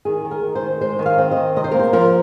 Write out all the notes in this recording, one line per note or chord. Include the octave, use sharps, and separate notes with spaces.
D#3 G#4
D#3
A#4
D#3
C5
D#3
G#3 C5
D#3
F5
C4
D#5
D#3
C3 D#5
C5
A#4
A#3
C5
F3 A#4